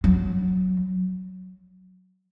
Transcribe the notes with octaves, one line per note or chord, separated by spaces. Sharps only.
F#3